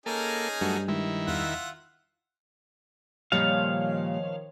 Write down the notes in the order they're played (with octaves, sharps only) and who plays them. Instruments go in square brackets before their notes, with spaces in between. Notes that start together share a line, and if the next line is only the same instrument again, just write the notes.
[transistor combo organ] A#3 A4 [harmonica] C#4 D#4 G#4
[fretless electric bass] G2 [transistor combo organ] F#3 A3
[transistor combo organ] D#3 E4 [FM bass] G#3
[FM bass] E2 [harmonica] F4 E5 F#5
[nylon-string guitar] A#2 G3 [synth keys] D#3 F3 C#5 [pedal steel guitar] F5